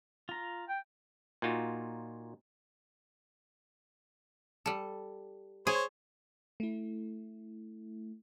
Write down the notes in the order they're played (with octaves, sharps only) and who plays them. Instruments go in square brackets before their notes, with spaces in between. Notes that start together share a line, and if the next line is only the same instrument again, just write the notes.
[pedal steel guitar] F4 A#5
[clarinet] G5
[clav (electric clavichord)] A#2 D#4 F4 F#4
[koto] G3 A4
[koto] G#4 [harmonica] C5 C#5
[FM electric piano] A3 E4